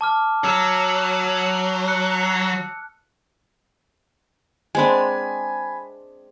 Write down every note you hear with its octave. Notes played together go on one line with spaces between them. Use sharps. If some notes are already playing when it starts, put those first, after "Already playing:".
A5 D6 F6
F#3 E6
F#6 C#7
G#3 C4 D4 G#5 B5